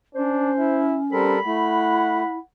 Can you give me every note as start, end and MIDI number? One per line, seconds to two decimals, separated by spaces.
0.15 1.35 61
0.15 0.52 62
0.15 0.81 72
0.58 0.99 64
1.12 1.39 55
1.12 1.35 60
1.12 1.39 69
1.12 1.39 70
1.12 2.35 83
1.45 2.23 57
1.45 2.37 64
1.45 2.42 78